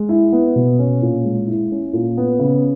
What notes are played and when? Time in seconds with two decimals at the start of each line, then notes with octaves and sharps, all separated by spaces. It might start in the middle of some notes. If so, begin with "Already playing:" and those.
Already playing: G#3
0.09 E4
0.32 B3
0.56 B2
0.79 C#4
1.02 A#2
1.24 G#3
1.47 E4
1.71 C#4
1.93 A#2
2.17 B3
2.39 C#3